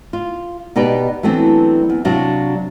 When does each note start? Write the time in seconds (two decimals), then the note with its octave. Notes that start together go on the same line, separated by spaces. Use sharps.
0.13 F4
0.76 B2 D#4 G4 B4 D5
1.23 E3 F#3 A3 B3 C4 D4
1.90 E2
2.05 C3 F#3 D4 F#4 F5